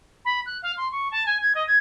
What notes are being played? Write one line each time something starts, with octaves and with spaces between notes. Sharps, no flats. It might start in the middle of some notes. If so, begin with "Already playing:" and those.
B5
F#6
F5
C6
C#6
A5
G#5
G#6
D#5
G#6